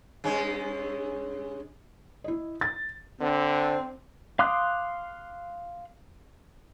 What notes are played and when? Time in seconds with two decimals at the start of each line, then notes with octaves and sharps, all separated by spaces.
0.24 G2 G#3 C#4
2.24 E4 D#5
2.61 A6
3.21 D3 C4
4.39 F5 C6 D6 D#6 F#6